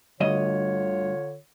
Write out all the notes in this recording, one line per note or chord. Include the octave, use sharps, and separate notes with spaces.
D2 G2 D3 F4 C#5 D#5